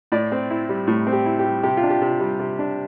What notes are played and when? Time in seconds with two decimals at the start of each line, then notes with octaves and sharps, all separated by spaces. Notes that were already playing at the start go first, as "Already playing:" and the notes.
0.12 A2 D5
0.32 C4
0.51 E4
0.69 G3
0.87 A2
1.07 C4
1.13 G4
1.26 E4
1.39 G4
1.44 G3
1.63 C3 G4
1.77 F4
1.83 D4
1.90 G4
2.02 C3
2.20 G3
2.39 C3
2.59 D4